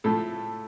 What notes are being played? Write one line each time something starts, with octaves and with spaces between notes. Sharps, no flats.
A2 F3 A3 A4